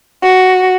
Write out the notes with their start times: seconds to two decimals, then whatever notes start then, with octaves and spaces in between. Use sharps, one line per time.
0.22 F#4